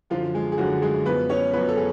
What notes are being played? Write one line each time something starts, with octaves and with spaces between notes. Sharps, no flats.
F#2 D3 F3 F4
G#3 G#4
G#4
F#2 D3 F3 F#3 F#4
G#3 G#4
F#2 F3 B3 B4
C#4 C#5
F#2 F3 B3 B4
A4
G#4